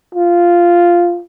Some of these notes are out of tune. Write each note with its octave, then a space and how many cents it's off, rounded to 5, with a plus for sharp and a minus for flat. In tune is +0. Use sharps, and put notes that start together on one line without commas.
F4 -5